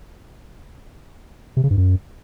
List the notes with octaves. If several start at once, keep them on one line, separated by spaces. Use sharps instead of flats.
C3
C#3
G2
F#2